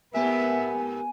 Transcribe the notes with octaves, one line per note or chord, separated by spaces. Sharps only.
G#2 B3 G4 A#4 E5 G#5